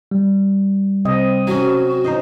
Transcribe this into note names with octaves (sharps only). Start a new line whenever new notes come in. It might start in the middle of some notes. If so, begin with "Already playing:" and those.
G3
C3 C4 D#5
F#3 C#4 F#4
C#4 D#4 C5 D#5